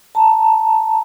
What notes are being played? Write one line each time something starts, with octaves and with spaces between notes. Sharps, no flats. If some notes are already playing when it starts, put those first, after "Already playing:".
A5 A#5